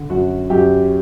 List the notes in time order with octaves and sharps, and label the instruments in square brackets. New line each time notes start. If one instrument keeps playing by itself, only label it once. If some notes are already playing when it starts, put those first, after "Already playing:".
Already playing: [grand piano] D3
F#2 F#4
F#2 G4